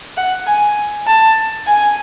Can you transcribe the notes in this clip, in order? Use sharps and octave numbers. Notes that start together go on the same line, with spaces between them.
F#5
G#5
A5
G#5